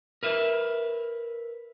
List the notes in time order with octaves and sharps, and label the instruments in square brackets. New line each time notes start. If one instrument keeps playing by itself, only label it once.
[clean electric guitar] A#4 B4 E5